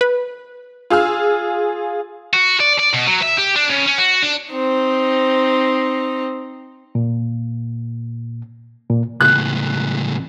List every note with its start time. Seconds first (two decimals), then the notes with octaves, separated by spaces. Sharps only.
0.01 B4
0.90 F4 G#4 E6 F6
2.34 F#4
2.60 D5
2.79 D5
2.94 B2
3.08 F#3
3.23 E5
3.38 G4
3.56 D4
3.70 C#3
3.86 C#4
3.98 F#4
4.23 D4
4.52 C4 D#4
6.95 A#2
8.90 A#2
9.21 C#2 A2 F#6